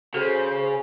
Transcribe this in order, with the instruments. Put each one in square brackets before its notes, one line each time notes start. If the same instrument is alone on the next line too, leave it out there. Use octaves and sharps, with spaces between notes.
[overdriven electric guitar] C#3 [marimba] F#4 A4 [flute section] C5